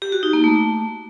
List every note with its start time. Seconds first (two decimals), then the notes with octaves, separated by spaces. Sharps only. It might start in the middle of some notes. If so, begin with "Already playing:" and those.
0.02 G4
0.12 F#4
0.23 D#4
0.33 A#3
0.44 A3